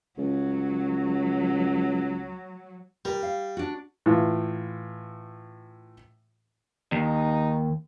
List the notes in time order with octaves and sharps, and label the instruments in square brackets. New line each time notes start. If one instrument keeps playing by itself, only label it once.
[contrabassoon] C#2 [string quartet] F#3
[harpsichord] G3 [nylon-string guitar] A#4
[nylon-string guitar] F5
D4 F#4
[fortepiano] A2 E3 F4
[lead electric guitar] D#2 [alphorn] D#4